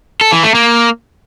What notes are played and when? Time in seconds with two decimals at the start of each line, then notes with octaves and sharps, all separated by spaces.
0.21 A4
0.32 E3
0.43 A3
0.55 A#3